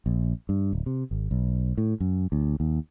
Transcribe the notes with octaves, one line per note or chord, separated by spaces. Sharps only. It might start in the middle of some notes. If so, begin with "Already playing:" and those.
A#1
G2
D1
C3
G#1
B1
A2
F#2
D2
D#2